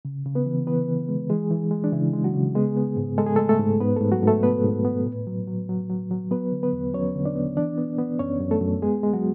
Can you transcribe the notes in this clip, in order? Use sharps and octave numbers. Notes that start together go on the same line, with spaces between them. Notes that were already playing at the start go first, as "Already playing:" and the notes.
C#3
C#3
B3 B4
E3
E3 B3 B4
E3
G#3
E3 G#3 G#4
E3
G#3
D4
C#3 E3 E4
G#3
F#3 F#4
C#3
G#3 B3 G#4
B3
G#2
G#3 A4
G#4
G#3 A3 A4
A3 A4
G#2
G#2 B3 B4
G#2 A3 A4
F#3 F#4
G#2
A3 A4
B3 B4
G#2
B3
A2
F#3
F#3
F#3
F#3
F#3
F#3 B3 B4
D3
B3 B4
E2
F#3 C#4 C#5
D3
D4 D5
B3
E3 D4 D5
B3
B3
F#2 C#4 C#5
F#2
A3 A4
F#2
G#3 B3 G#4
G#3
F#3 F#4